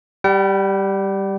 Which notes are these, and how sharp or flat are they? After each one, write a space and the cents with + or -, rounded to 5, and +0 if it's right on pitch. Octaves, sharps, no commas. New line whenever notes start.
G3 +0 G5 -45